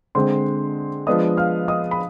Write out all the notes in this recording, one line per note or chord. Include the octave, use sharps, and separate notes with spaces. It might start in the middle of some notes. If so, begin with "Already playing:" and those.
D3 G#3 C4 C5 C6
F3 G#3 B3 D4 D#5 D#6
F5 F6
D#5 D#6
B5